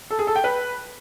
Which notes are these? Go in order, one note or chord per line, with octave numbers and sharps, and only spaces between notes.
A4
G#4
A4
G5
B4